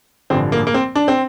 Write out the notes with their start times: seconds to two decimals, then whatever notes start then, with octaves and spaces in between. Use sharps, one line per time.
0.30 A1 G2 D3 F3 C4
0.52 A#3
0.67 A#3
0.74 C4
0.95 D4
1.08 C4